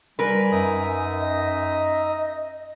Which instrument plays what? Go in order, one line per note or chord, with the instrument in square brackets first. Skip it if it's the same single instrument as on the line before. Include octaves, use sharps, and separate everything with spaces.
[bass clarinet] G3 [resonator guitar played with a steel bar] A#4 B4 [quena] G#5
[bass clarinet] F#2 [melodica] D#4 E5 D#6
[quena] D#5